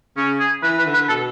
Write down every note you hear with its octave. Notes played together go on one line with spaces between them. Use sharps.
C#3 C#4
G#4
E3 B4
B4
D3
B4
B2 A4